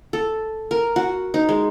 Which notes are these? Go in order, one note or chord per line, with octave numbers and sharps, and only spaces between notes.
A4
A#4
F#4
D#4
G#3